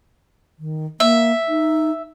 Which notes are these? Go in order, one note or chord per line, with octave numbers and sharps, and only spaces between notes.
D#3
A#3 E5
D#4